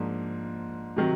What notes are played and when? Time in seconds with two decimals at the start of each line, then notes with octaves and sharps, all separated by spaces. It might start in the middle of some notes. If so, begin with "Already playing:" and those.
Already playing: G#2 F3 A#3 D4
0.97 C3 D#3 F#3